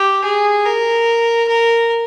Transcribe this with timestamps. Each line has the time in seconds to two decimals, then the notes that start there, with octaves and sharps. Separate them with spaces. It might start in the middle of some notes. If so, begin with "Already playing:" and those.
Already playing: G4
0.24 G#4
0.66 A#4
1.48 A#4